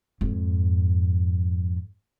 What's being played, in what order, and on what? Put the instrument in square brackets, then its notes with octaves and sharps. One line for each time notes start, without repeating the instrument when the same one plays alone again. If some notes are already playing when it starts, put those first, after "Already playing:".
[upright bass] F2 G#2